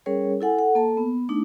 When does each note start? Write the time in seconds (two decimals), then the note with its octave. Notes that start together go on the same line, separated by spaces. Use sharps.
0.06 G3 C#4 G#4 A#4 C#5
0.41 E4 A4 F#5 G#5
0.58 A4 F#5
0.75 A#3 A4 A5
0.97 B3
1.29 A3 D4 D#4